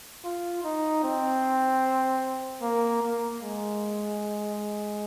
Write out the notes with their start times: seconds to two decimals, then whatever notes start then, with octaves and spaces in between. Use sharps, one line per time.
0.24 F4
0.64 D#4
1.03 C4
2.62 A#3
3.02 A#3
3.42 G#3